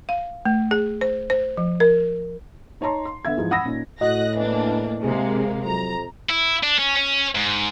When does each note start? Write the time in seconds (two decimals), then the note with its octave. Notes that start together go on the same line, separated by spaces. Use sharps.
0.09 F5
0.45 A3
0.71 G#4
1.01 C5
1.30 C5
1.57 F3
1.80 A#4
2.81 D#4 C#5 A5 A#5 C6
3.05 C6
3.25 D3 B3 E5 G#6
3.37 G#2 E3 F3 G#3
3.51 F#5 B5 D#6 E6 A#6
3.65 A#2 C#4 D#4
4.01 A2 F#4 D#5 D#6 F#6 A#6
4.36 E3 A#3 B3 D4
5.03 C3 G#3 A#3 G#4
5.65 F2 F#3 A#5
6.29 E4
6.63 D4
6.79 C#4
6.96 C#4
7.35 G#2